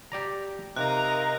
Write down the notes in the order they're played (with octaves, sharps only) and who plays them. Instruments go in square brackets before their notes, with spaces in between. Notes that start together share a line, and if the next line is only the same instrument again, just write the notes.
[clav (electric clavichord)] G4 D5 A#5
[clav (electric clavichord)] C3 [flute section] D#4 D#5 F5 [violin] A#4 A#5 [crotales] F#6